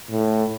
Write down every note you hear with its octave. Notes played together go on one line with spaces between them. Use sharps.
A2